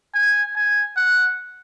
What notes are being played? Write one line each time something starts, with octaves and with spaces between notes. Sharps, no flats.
G#5
G#5
F#5